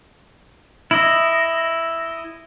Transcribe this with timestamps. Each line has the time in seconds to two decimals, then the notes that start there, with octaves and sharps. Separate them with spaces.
0.91 E4 D#5